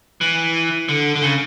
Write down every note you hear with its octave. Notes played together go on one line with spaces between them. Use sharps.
E3
D3
D3
C#3